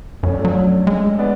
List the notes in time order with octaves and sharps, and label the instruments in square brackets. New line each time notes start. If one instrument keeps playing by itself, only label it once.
[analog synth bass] F#2 [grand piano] A3 C#4
[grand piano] D4
A3 C#4
[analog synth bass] F#3
G#3
[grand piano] B3 D4